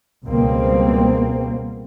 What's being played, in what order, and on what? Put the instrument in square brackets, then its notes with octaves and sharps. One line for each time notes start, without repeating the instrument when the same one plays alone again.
[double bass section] C#2 B2 G3 A#3 C4